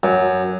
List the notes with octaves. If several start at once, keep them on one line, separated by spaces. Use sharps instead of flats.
F#2